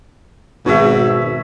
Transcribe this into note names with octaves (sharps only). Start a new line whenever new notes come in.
G#1 B2 D#4 G#4 C#5 E5